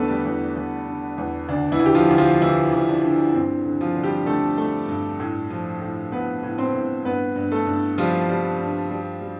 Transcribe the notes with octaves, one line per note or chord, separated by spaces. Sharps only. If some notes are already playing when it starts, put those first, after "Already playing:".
Already playing: E2 D3 A3 B3 A4 B4
G3 G4
E2
E2
D3
E2
D2 D4
E3 E4
D2
G4
F3 F4
D2
F3 F4
D3 E3 E4
D2
D4
D3
G2 C4
D3
F3 F4
D3
G3 G4
D3 A3 A4
A3
G2
A2
F3
A2
A2 B3 B4
A2
C4 C5
A2
G2 B3 B4
G2
A3 A4
G2
F3 G3 F4
G3
G2
G3
G3